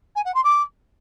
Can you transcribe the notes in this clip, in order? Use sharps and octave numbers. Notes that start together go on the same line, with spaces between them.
G#5
F#5
C6
D6